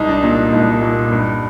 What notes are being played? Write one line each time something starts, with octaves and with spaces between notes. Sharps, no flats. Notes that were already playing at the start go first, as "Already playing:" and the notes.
Already playing: C2 D#4
D4
A#2 D4
C2 D#4
A#2
G2